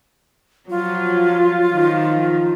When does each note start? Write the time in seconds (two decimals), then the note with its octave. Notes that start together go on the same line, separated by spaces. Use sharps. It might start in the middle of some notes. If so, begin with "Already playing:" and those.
0.70 F3 F#3 F4
1.73 D#3 F3